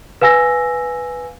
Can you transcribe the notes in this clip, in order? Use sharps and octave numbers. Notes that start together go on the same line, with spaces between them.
B4 F5 G#5 E6 A#6